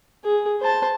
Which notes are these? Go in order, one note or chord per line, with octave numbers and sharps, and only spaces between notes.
G#4
C5 A5